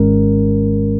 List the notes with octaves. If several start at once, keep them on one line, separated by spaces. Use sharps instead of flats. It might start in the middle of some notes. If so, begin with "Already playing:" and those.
Already playing: G#1 G#2 D#3 G#3 C#4 A#4